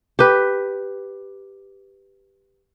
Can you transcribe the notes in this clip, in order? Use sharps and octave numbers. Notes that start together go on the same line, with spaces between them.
G4 B4